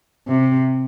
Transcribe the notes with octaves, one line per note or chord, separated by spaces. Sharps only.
C3